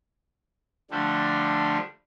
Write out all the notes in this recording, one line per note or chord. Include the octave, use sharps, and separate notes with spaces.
D3 F3 G3 A3 D4